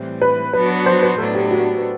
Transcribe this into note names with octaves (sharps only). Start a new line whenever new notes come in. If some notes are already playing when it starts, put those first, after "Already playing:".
Already playing: A2 E3 G3 C4
B4
F#3 B3 D4 F#4 B4
C5
B4
A2 F#3 B3 D4 A4
G4
F#4